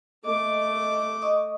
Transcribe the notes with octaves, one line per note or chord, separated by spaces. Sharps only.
A3 D#5 D6
D#5 C#6 D#6